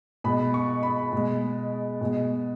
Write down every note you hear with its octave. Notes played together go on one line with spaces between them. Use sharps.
B2 G#3 B5
C#6
B5
B2 G#3
B2 G#3